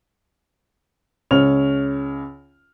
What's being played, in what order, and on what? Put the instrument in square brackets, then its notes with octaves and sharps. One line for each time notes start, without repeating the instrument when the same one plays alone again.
[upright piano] C#2 C#5 F6 F7